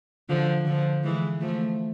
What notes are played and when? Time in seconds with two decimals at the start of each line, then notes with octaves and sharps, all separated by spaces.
0.29 D3 F3
0.66 D3 F3
1.04 E3 G#3
1.41 F3 A3